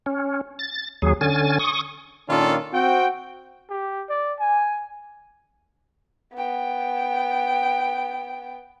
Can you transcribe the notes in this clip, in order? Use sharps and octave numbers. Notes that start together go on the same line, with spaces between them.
C#4
A6
D#2 F#3 G#4
D3 C#4 G#5 A6
C#6 D#6
A#2 D#3 C#4 D4 F4 A4
C4 F#4 G5
G4
D5
G#5
B3 G5